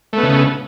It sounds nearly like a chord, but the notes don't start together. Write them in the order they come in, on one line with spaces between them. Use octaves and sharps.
A3 B3 C#3